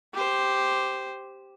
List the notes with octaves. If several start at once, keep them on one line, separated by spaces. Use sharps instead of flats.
G4 C5